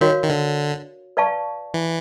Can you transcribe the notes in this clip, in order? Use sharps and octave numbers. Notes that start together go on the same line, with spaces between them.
D#3 F#4 A#4 C#5 F5
D#3
D3
B4 D5 F5 A5 C#6
E3